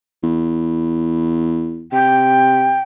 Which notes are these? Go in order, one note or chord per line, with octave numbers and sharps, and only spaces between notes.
E2
C3 G5